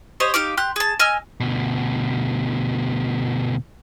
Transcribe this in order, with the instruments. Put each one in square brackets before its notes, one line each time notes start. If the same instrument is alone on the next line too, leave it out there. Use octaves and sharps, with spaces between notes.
[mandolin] G4 C5 C#5 D#5
D#4 G4 F5 D6
G4 C6 F#6
G#4 A5
D#5 G#5 E6 F6
[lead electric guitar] D2 B2